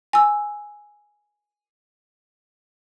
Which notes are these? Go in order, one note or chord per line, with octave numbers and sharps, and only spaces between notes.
G#5 E6